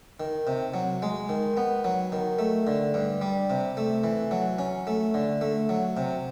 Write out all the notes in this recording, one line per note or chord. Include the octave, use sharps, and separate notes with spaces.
D#3
C3
F#3
G#3
D#3
B3
F#3
D#3
A3
D3
G2
G3
C3
A3
E3
F#3
C#4
A3
D3
A3
F#3
C3